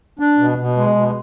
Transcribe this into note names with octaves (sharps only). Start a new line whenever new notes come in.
D4
B2
B2
G#3
B2